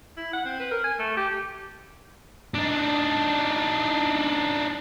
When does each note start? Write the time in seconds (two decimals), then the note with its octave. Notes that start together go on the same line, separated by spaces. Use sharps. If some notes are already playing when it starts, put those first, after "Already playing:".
0.17 E4
0.33 F#5
0.45 C4
0.60 B4
0.71 A#4
0.84 G#5
0.99 A3
1.17 G4
2.54 D4 D#4